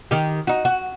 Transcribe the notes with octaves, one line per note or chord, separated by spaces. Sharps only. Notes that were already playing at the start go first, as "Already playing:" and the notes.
D#3 G4
D#4 F#4
F#4